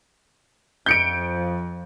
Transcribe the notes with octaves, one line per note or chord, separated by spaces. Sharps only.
F2 F3 G6 C#7 D7